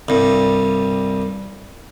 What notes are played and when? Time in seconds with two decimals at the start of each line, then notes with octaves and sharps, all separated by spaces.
0.08 C2 G2